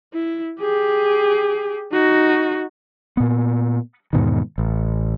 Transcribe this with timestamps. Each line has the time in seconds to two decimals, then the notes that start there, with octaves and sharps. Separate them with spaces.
0.13 E4
0.61 G4 G#4
1.92 D#4 F#4
3.17 A#2 B3
4.13 E2 G#2 B2 D#3
4.58 A1